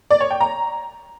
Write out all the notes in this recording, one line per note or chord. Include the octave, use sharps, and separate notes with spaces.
D5
C#5
G5
A#5